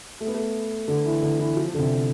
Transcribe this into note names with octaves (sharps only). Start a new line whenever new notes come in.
A3
B3
A3
D3
E3
D3
E3
F3
D3
C3